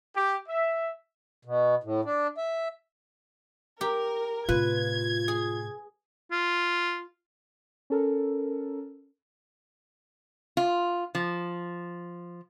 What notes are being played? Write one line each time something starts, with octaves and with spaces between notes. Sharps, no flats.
G4
E5
B2
A2
D4
E5
G4 A#4
A2 C3 F4 B4 G#6
G#4
F4
C#4 A4 A#4
F4
F3